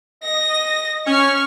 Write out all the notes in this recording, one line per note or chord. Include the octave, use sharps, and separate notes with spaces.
D#5 A#6
C#4 C#6 F6